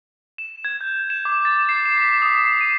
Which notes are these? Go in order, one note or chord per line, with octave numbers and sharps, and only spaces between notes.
E7
G#6
G6
E7
D6
A6
C7
E7
B6
D#6
C7
D#7